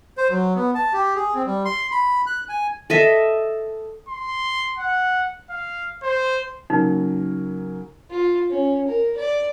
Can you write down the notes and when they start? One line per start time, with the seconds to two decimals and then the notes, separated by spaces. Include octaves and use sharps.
0.17 C5
0.30 F#3
0.56 B3
0.75 A5
0.93 G4
1.16 G#4
1.34 C4
1.46 G3
1.65 C6
1.92 B5
2.26 F#6
2.49 G#5
2.90 A4 D#5 E5
4.09 C6
4.78 F#5
5.50 F5
6.02 C5
6.70 C#3 F#3 A#3 D#4
8.10 F4
8.50 C#4
8.87 A#4
9.17 D5